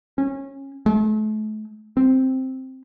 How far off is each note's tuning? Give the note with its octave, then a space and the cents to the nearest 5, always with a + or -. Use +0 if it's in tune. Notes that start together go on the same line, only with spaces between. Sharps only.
C#4 -20
A3 -35
C4 +0